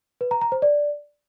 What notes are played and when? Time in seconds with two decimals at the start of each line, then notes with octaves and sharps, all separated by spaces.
0.21 B4
0.31 A#5
0.42 A#5
0.52 C5
0.62 D5